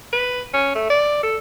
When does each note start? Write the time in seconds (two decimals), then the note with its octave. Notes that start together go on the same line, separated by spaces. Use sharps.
0.13 B4
0.54 C#4
0.75 A3
0.90 D5
1.23 A4